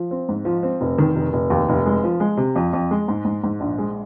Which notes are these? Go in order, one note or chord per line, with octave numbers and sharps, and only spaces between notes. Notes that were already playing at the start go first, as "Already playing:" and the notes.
Already playing: F3
C4
G#2
F3
C4
F1
D#3
F1
F1
D#2
F1
G#3
F3
G#3
C3
F2
F2
G#3
G#2
G#2
G#2
A#1
G#3